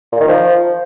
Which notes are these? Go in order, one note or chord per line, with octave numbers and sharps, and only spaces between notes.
A#2
D#3
F3